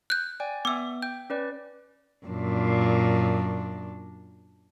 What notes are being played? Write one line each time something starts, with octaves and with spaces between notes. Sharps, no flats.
F#6 G6
D5 G5 G#5
B3 E5 D6 E6
G5 G6
C#4 B4 D5
F#2 A#2 D4